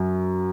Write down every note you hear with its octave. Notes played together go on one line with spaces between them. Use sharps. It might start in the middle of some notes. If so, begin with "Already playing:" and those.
Already playing: F#2